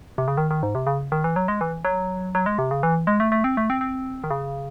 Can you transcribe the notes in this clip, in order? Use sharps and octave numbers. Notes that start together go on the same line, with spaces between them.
C3
C#3
D#3
D#3
G#2
C3
C#3
D#3
E3
F#3
G#3
E3
F#3
F#3
G#3
C3
C#3
E3
G#3
A3
A3
C4
A3
C4
C4
D#3
C#3